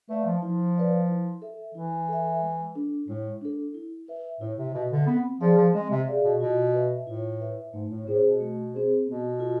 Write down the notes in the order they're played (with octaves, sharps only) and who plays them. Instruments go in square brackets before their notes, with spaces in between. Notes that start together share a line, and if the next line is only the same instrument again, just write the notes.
[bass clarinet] A3 [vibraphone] B4 D5 F5
[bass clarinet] F3
[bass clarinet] F3 [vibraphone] E4
[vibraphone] B4 D5 F5
E4
A4 E5
[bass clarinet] E3 [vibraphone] E4
[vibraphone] A4 E5
G#3
D4 A4
[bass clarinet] A2 [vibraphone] G#3
[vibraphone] D4 A4
E4
B4 E5
[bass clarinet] A2 [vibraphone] E4
[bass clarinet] C3
[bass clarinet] B2 [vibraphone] B4 E5
[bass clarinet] D3
[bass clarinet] B3 [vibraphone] C4
[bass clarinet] F3 [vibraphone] G#4 D5 F5
[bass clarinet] F3
[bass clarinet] G#3 [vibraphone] C4
[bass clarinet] C3
[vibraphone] G#4 D5 F5
[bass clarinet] B2
[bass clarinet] B2 [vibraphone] F4
[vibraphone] B4 E5
[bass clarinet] A2 [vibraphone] F4
[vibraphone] B4 E5
[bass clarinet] G#2 [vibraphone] A3
[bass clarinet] A2
[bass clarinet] A2 [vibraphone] C4 G#4 C5
[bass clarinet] B2
[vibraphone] A3
C4 G#4 C5
[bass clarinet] B2 [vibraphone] B3
[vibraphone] F4 A4